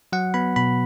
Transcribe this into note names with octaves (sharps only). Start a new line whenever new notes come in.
F#3 F#5
B3 B5
B2 B5